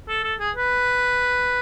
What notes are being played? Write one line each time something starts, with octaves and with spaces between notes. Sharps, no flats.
A4
A4
G#4
B4